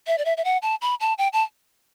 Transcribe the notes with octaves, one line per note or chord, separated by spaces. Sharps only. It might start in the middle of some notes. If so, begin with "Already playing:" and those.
E5
D5
E5
E5
F#5
A5
B5
A5
G5
A5